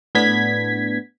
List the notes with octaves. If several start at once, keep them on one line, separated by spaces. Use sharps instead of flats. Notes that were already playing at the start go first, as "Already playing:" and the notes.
A2 B3 D4 G#6 B6